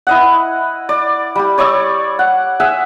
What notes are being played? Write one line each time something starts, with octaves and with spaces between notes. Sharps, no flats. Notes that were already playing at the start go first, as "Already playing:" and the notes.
E4 D#5 F#5
D5
G3 G4
C#5 D5 C#6 E6
F#5
G#4 E5 F#5